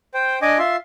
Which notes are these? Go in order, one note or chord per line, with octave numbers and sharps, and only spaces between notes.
C5 G5
D4 D#5 G#5 D6
F4 E5 C6